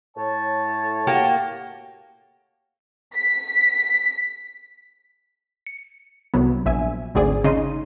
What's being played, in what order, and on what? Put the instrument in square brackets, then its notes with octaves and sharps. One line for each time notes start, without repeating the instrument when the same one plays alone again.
[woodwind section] A2 C#5 A5
[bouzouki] A#3 F#4 G4
[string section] B6
[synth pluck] C#7
C2 F#3 B3
A#1 E5 G#5
G#1 D2 C4 G#4 D5
C#3 D#4 D#5 C6 D#7